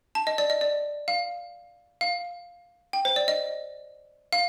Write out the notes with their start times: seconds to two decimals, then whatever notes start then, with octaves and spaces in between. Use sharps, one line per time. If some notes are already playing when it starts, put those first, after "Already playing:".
0.15 A5
0.27 D#5
0.38 D5
0.50 D#5
0.61 D5
1.08 F5
2.01 F5
2.93 G5
3.05 C5
3.16 D5
3.28 D#5
4.33 F5